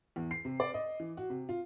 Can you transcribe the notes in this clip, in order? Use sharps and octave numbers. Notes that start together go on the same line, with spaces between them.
E2
C7
C3
D5
D#5
E3
F#4
C3
F4